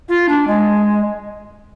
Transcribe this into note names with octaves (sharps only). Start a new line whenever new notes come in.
F4
D4
G#3